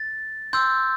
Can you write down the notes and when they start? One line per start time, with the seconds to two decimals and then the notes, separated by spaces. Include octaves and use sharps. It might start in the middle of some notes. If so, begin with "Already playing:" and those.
Already playing: A6
0.53 C6 E6 G6